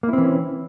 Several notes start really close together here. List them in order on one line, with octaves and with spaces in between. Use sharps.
A#3 E4 C4 E3 C#4